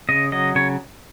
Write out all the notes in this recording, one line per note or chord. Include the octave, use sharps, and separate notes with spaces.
C#3 D#5
F#3 D#5
C#3 C#5